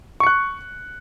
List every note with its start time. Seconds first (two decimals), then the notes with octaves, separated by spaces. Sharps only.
0.20 C#6
0.23 C#7
0.27 F#6